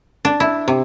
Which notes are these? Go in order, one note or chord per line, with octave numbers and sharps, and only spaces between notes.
D4
E4
C3